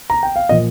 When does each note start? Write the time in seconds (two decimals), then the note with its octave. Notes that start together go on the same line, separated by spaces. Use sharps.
0.10 A#5
0.23 G5
0.36 F5
0.49 A#2 F3 D#5